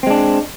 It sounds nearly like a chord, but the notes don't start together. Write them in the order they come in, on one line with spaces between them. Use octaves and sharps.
C4 G#3 D4